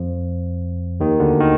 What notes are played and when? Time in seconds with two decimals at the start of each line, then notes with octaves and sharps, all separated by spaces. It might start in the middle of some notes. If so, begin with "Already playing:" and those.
Already playing: F2 F3
1.00 D#2 D#3
1.20 D2 D3
1.40 D#3